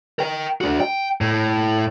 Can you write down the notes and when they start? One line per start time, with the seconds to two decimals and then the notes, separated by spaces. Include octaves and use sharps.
0.19 A#4 G5
0.61 D4 F#4
0.80 G5
1.21 A2